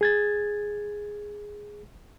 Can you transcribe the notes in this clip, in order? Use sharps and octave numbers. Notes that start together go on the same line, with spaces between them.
G#4 G#6 A6